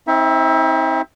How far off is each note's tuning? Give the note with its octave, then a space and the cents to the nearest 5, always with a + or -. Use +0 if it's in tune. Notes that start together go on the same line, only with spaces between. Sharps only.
C4 +15 D#4 +45 E5 +0